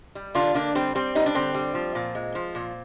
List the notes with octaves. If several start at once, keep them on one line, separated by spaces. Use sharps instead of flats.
G3
D3 D4 F4
D3 A#3 D4
G3 C4
G3 C4
G3 D#4
D4
D3 C4
G3
F3
A#2
G#3
F3
A#2